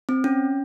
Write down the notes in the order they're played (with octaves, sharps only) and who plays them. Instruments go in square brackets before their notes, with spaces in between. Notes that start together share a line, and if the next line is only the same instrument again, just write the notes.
[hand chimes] C4
C#4